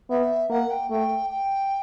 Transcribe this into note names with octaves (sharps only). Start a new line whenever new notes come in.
B3 E5
A#3 F#5
G5
A3 G5
G5